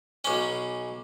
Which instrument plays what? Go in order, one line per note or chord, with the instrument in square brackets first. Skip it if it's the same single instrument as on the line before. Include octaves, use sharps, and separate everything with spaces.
[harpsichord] B1 C#4